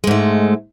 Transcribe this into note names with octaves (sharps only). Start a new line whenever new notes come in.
G#2 G#3 A3